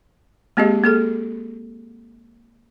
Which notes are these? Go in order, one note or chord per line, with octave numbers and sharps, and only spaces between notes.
G#3 A#3 C4 G4 G#4 D#5
A#3 G#4 A4